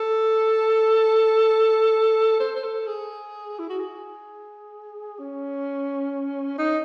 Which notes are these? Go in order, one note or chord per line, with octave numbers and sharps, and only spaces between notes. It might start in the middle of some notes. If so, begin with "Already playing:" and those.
Already playing: A4
C5
C5
A4
G#4
E4
F#4
G#4
C#4
D#4